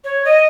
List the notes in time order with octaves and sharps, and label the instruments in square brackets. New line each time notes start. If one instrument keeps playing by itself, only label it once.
[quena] C#5
D#5